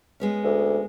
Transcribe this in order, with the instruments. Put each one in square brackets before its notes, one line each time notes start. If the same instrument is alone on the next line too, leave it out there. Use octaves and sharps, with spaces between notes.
[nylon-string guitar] G#3 B3 C#4
[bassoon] D2